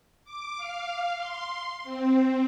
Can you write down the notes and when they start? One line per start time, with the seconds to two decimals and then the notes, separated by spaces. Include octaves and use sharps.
0.24 D6
0.57 F5
1.17 C6
1.84 C4